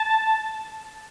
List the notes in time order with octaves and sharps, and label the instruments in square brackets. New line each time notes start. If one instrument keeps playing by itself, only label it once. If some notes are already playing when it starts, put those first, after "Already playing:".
Already playing: [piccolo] A5